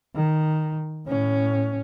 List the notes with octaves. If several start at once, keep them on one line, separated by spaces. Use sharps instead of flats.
D#3
A2 C#4